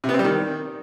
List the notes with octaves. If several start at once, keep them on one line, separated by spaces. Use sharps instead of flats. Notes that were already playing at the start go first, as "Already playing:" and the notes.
C3
B3
C4
G3
D#3